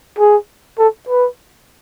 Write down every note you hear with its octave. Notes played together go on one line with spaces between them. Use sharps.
G#4
A4
B4